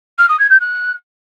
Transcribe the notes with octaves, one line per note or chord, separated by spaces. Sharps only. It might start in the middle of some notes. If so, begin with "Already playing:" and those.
F6
D#6
G#6
G6
F#6